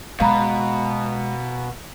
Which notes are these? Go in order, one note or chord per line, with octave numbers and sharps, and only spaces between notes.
B2 G#3 F5 A#5 B5